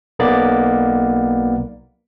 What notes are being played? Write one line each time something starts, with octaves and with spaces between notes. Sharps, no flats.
B1 A#3 B3 D5